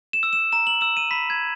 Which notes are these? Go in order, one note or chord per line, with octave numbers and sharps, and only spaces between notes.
E7
E6
E7
A#5 E7
F#7
E6 E7
D#7
B5 B6
G#6